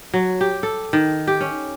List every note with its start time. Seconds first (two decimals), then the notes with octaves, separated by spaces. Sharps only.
0.14 F#3
0.41 G4
0.63 A4
0.93 D#3
1.27 G4
1.41 C#4